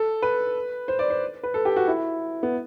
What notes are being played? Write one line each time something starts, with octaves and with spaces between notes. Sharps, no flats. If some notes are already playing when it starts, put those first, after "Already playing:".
Already playing: A4
B4
C5
D5
C5
B4
A4
G4
F#4
E4
B3